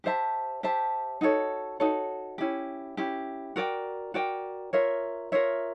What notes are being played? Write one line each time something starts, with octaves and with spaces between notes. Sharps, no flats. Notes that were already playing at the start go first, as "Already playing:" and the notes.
G4 C5 E5 A5
G4 C5 E5 A5
D#4 F#4 A4 C#5
D#4 F#4 A4 C#5
C#4 E4 G4
C#4 E4 G4
F#4 A#4 D5 G5
F#4 A#4 D5 G5
F4 A#4 C#5 E5
F4 A#4 C#5 E5